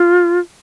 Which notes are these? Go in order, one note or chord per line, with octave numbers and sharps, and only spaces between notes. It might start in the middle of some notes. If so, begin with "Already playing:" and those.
Already playing: F4